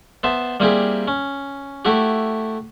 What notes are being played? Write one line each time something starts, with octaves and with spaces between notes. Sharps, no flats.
B3 C5 E5 A5
G3 A#3 C4 E4 G4 G#4
C#4
A3 E4 F#4 G4